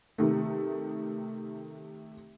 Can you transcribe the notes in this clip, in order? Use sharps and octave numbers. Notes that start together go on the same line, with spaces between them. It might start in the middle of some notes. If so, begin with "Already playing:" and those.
C3 D#3 A3